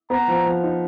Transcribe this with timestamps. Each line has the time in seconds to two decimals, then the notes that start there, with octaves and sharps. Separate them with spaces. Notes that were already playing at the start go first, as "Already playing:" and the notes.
0.10 B3 A#5
0.28 F3
0.46 F3
0.63 D#4